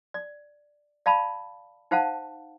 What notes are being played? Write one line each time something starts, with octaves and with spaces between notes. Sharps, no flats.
D5
D5 F5 A5 B5
D#4 C5 F5 F#5 A5